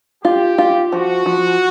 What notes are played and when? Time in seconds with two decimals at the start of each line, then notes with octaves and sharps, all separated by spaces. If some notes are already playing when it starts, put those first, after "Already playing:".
0.24 F4 G4
0.58 F4
0.92 F3 F#4
1.26 F3